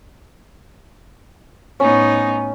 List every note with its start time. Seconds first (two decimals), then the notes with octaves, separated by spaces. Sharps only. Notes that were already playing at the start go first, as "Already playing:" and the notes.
1.80 A2 B3 C#4 D#4